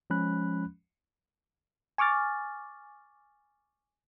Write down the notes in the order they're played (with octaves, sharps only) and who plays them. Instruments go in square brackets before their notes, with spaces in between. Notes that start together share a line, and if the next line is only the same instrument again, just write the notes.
[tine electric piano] F3 G#3 C#4 B5 F#6
[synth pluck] G#5 C#6 D6 F6 A6